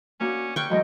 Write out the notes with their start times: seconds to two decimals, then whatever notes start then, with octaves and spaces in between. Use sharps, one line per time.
0.20 A#3 C#4 D4 F#4
0.56 G2 G5 C#6
0.70 D2 G#2 E3 F#3 D#5